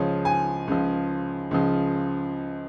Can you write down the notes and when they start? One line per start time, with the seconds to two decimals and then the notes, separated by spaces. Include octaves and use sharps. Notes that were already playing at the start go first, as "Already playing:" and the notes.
Already playing: C#2 C#3 F3 C#5
0.25 G#5
0.68 C#2 C#3 F3
1.51 C#2 C#3 F3